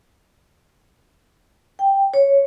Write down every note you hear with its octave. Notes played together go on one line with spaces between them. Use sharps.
G5
C#5